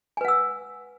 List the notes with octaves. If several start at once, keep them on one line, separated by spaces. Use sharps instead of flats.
B4 F#5 G#5 E6